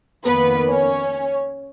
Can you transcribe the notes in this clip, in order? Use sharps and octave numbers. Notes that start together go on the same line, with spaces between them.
F2 D#3 A#3 B3 B4
C#4 C#5